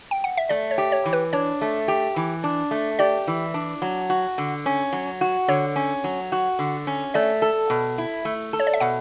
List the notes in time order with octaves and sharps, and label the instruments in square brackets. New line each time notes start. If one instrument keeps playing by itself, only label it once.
[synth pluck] G5
F#5
E5
[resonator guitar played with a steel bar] A3 [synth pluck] D5
[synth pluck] C#5
[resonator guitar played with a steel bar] G4
[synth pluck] C#5
[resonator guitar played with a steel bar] E3
[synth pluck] B4
[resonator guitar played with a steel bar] D4 [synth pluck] C#5
[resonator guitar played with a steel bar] A3
G4
E3
D4
A3
[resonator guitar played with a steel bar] G4 [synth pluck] D5
[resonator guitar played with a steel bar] E3
D4
F#3
F#4
D3
C#4
F#3
F#4
[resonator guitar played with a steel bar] D3 [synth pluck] C#5
[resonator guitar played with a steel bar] C#4
F#3
F#4
D3
C#4
[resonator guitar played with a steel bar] A3 [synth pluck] D5
[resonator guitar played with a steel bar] A4
B2
E4
A3
A4
[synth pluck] C#5
D5
E5
[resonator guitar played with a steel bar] B2 [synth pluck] F#5